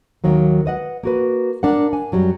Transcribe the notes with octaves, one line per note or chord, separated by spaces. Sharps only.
D#2 D#3 F#3 A#3
B4 D#5 F#5
A#3 F#4 B4
D4 A#4 F#5
G#5
F#2 F#3 G3